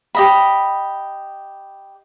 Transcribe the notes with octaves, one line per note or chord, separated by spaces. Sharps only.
G4 D#5 B5